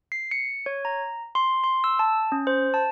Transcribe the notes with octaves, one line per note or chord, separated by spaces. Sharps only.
C7
C#7
C#5
A#5
C6
C6
E6
A5
C#4
C5
A5